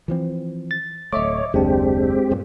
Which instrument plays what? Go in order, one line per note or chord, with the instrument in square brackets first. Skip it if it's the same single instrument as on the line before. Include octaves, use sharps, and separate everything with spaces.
[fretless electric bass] E3 F3 C4
[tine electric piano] A6
[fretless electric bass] D1 A3 [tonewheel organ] C#5 [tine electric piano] D#5 E5 D6
[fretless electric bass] F#1 [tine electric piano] D#2 D4 [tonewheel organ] G#3 C4 G4
[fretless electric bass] G2 A#2